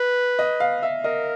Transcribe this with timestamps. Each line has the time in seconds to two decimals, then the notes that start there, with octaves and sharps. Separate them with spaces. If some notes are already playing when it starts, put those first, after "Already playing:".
Already playing: B4
0.39 D#5
0.60 F5
0.83 E5
1.04 A#4 D#5